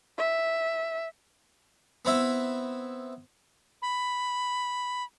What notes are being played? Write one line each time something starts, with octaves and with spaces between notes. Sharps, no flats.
E5
B3 C4 E4 E5
B5